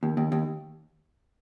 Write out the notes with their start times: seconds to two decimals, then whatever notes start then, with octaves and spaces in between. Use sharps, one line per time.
0.03 D#2
0.17 D#2
0.32 D#2